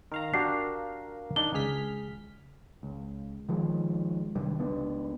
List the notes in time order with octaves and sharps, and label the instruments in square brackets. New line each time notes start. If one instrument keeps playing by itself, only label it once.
[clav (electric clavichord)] D#3 [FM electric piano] A#4 F5 A#5
[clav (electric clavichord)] D4 F#4 G4 [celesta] C7
[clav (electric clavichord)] D4 D#4 [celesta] G7
[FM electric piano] C#2 F6 B6 [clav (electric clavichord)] G#4
[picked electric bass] C#2
D#3 F3 G#3
G2 C3 D#3 G3
C#2 B3 D4